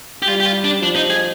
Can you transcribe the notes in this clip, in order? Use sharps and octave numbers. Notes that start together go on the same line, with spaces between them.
G4
G3 F4
G4
F4
D4
F3 D4
D#4
G#4